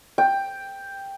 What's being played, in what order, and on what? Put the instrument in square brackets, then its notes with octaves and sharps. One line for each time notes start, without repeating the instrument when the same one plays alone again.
[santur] G5